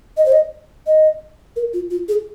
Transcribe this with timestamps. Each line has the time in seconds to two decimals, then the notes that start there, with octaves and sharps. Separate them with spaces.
0.17 D#5
0.26 C5
0.32 D#5
0.87 D#5
1.56 A#4
1.74 F4
1.90 F4
2.09 G#4